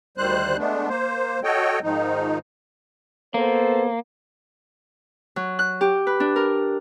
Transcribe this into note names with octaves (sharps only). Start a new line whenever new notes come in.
D2 D#3 G3 C5 F#6
G#3 A3 B3 D4
A#3 C5
F#4 A4 C#5 D#5 G5
G#2 D#3 F3 D#4
A#3 B3 A4 C5
F#3
F#6
G4
B4
D4
A#4